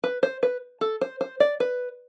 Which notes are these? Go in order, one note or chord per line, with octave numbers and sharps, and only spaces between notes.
B4
C5
B4
A4
C5
C5
D5
B4